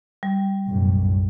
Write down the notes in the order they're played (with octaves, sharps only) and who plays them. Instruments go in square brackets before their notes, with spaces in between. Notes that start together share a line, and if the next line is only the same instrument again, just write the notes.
[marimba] G3
[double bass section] B1 F#2 A2